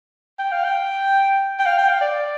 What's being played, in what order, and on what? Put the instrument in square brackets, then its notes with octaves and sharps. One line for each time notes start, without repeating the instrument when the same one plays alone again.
[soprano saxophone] G5
F5
G5
G5
F5
G5
F5
D5